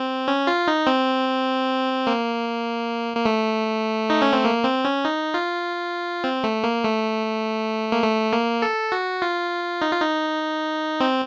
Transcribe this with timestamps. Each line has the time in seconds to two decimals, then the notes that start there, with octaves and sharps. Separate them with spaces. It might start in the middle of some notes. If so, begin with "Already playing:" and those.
Already playing: C4
0.28 C#4
0.47 F4
0.67 D#4
0.87 C4
2.07 A#3
3.16 A#3
3.26 A3
4.10 D#4
4.22 C#4
4.33 C4
4.45 A#3
4.64 C4
4.85 C#4
5.05 D#4
5.34 F4
6.24 C4
6.44 A3
6.64 A#3
6.84 A3
7.92 A#3
8.03 A3
8.33 A#3
8.62 A4
8.92 F#4
9.22 F4
9.82 D#4
9.92 F4
10.02 D#4
11.00 C4